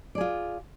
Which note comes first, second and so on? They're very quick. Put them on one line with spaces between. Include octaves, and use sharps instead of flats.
D5 G#4 F4